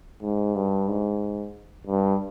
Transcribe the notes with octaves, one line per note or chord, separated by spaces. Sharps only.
G#2
G2
G#2
G2